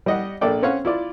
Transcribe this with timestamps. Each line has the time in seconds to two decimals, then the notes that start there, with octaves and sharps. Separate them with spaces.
0.06 G3 D#5 F#5
0.41 A#1 A4 D5 G5
0.62 C4 C#4 C#5 F5 F#5
0.85 E4 F4 D5